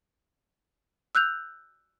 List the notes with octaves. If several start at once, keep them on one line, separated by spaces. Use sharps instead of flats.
E6 F#6 G6 F7